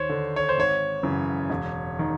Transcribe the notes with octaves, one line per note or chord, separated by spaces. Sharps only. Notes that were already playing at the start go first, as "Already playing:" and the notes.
Already playing: D#2 C5 C#5
D3
C#5
C5
G#1 C#5
F#2 C#3 E3
E1
D#3